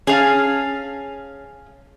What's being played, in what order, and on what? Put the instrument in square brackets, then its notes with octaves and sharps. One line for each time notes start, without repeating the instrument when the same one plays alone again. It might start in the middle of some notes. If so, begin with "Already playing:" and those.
[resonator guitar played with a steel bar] C#4 [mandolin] G#4 F5 A5